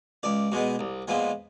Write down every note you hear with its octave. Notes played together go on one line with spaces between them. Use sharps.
C#2 D5
B2 G#3 B3
C2
A#2 F3 G#3 B3